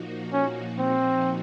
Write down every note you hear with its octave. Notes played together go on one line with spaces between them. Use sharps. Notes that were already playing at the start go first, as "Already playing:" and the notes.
Already playing: A#2 F3 A#3 D#4 F#4
C#4
C4